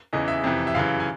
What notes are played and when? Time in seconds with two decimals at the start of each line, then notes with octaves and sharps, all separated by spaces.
0.13 E2 C#3 E3 D#5
0.28 E5
0.44 F2 C3 E3
0.67 E5
0.75 F#2 C#3 E3 F5
1.00 G#5